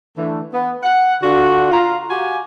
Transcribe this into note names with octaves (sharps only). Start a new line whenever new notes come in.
D3 E3 A3
B3
F#5
D3 D4 F4 F#4
F4 A#5
F#4 G4 F5 G#5